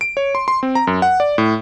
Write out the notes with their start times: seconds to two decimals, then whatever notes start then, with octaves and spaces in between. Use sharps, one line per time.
0.01 D7
0.17 C#5
0.35 C6
0.48 C6
0.63 C4
0.75 A#5
0.87 F#2
1.02 F#5
1.20 D5
1.38 A2